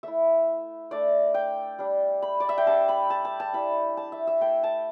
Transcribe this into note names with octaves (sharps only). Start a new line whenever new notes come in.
A3 E4 E5
A3 D4 D5
G5
G3 D4
B5
D5
E5
G5
G3 D4 A5
B5
A5
A5
A5
G3 E4 B5
A5
E5
E5
A3 E4 G5
A5